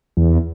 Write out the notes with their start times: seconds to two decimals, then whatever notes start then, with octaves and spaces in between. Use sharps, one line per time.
0.17 E2